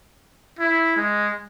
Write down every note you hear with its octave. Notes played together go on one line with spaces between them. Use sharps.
E4
G#3